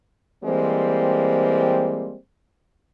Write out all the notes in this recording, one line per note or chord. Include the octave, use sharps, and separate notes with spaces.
E3 G3 G#3 A#3 C4